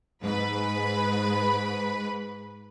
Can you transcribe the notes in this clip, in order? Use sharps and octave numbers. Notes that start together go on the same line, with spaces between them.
G#2 B4 B5